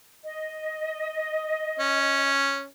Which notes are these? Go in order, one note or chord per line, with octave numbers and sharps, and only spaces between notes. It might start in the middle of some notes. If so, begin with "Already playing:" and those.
D#5
C#4